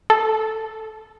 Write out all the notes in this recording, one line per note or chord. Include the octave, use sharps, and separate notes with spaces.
A4